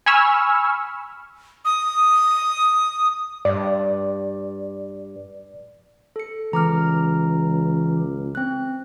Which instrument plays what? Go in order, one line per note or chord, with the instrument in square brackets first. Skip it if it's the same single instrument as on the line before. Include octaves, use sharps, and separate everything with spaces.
[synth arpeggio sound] G#5 B5 C#6 E6 F6
[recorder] D#6
[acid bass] G2 [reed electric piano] D5
[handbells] A4 C#7
[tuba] C#2 [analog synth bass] E3 [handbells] A#5 D6 F6
[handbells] C4 F#6